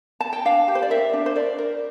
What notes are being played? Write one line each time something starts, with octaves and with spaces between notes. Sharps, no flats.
A5
G5
D4 F5
G4
C5
D5
A#4 E5
D4
C5
A#4 D5
A#4